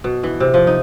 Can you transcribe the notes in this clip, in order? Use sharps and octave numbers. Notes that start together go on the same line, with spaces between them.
B2
E3
C3
F3
D#4